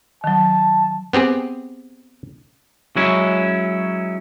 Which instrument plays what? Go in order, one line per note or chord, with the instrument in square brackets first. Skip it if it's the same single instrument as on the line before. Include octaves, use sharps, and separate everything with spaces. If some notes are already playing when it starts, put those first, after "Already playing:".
[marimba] D#3 F#3 [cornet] A5
[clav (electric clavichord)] B3 C4 G4 G#4
[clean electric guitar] F#3 G#3 C#4 E4